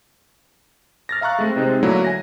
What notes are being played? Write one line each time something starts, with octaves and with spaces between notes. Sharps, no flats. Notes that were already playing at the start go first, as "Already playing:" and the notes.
F6 A6 A#6
E5 F5 A#5 C#6 F#6
G#3 A3 C4
C3 G#3 C4 D#4
D3 F#3 A3 A#3 E4
G#5 A#6